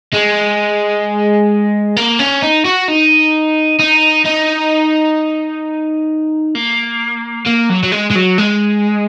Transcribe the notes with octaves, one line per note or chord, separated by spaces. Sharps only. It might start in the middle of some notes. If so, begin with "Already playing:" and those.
G#3
A#3
C#4
D#4
F#4
D#4
D#4
D#4
A#3
A#3
F#3
F#3
G#3
G#3
F#3
G#3